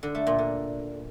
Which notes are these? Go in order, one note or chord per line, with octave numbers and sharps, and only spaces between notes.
D3
A3
A#2
D3